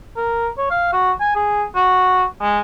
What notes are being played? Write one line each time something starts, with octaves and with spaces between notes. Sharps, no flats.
A#4
C#5
F5
F#4
G#5
G#4
F#4
G#3